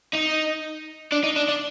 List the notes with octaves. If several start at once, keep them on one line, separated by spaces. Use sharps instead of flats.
D#4
D4
D#4
D4
D4